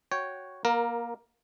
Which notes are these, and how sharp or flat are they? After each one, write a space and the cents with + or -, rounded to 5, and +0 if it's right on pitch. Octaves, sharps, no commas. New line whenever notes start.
F#4 +0 C#5 +0 G5 +0
A#3 +20 A#4 +0